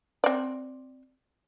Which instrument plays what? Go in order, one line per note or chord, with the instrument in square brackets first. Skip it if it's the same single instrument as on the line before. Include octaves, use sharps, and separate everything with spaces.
[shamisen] C4 D5